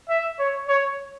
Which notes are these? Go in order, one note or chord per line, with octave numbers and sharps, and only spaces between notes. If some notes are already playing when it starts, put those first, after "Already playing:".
E5
C#5
C#5